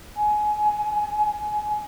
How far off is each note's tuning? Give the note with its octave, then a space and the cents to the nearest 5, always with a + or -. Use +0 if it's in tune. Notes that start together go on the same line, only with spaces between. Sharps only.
G#5 +20